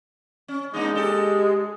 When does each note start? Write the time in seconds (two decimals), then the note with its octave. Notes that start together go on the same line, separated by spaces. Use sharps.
0.48 C#4
0.74 G#3 A#3 D4 D#4
0.95 G4 A4